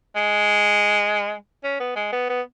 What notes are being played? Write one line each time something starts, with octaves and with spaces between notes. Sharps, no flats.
G#3
C#4
B3
G#3
B3
B3